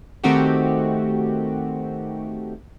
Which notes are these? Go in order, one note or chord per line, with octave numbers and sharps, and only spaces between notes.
D#3 A3 C4 D#4 F#4 G4